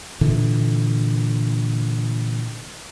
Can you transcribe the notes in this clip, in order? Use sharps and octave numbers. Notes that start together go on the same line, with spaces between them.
A#2 D3 E3